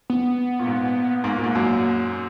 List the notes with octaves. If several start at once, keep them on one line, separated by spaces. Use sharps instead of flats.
B3
A#2
G#2
G#2 A#3
A#2
G#2
F#2